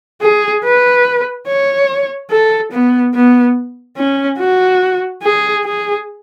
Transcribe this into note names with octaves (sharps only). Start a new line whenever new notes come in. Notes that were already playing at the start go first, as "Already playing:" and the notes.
G#4
B4
C#5
A4
B3
B3
C#4
F#4
G#4
G#4